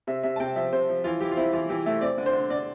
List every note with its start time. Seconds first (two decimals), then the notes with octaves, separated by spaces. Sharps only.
0.07 C3 E5
0.23 C3 E5
0.36 A5
0.40 C3 G5
0.56 F3 E5
0.72 C3 C5
0.89 F3
1.04 E3 F4
1.20 E3 G4
1.31 F4
1.37 C4 E4
1.53 E3 F4
1.69 E3 G4
1.86 A3 E5
2.01 C4 D5
2.18 D3
2.26 C5
2.33 D3
2.50 D3 D5